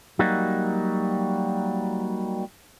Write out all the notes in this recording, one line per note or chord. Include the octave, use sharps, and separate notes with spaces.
F#3 G3 A#3 D#4 F#4